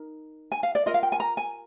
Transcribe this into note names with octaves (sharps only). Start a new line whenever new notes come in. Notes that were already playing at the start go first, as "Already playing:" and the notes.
Already playing: D#4 A#4
G#5
F5
D5
F4 A#4 D#5
F5
G5
G#5
A#5
G#5